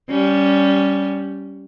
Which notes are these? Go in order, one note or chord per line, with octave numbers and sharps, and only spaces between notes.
G3 C#4